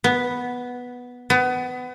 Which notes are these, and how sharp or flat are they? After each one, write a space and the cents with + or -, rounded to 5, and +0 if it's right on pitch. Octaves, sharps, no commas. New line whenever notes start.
B3 -5
B3 +25